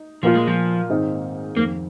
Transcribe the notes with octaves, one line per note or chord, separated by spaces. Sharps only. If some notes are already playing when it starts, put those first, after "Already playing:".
Already playing: D#4
A#2 F3 A#3 F4
G#3
F3
G#2 D#3 C4 D#4
F2 D#3 A#3 C4